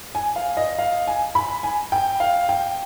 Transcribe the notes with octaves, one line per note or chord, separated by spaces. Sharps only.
G#5
F5
D#5
F5
G#5
B5
G#5
G5
F5
G5